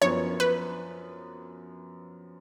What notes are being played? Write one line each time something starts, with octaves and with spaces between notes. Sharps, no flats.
F#2 F3 B3 C#5
B4